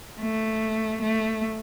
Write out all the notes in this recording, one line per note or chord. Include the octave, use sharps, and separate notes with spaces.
A3
A3